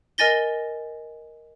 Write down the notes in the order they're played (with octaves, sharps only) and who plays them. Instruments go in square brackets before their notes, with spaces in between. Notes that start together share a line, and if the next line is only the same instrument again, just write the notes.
[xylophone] A#4 D#5 G#5 A6 A#6 G7